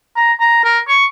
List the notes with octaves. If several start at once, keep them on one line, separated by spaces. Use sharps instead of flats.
A#5
A#5
A#4
C#6